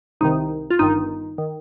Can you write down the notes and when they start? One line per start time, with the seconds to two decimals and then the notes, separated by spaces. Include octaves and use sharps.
0.21 C2 C3 D#3 D#4
0.70 F4
0.79 G1 G2 D#3 D#4
1.38 D#3